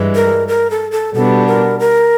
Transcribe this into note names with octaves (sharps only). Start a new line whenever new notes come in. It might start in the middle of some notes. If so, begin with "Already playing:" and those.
Already playing: G2 E3 G#3
A#4
A#4
A4
A4
B2 G3 B3 D4 A4
A#4
A#4